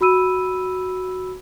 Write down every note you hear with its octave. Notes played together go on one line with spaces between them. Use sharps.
F#4 B5 E6 D#7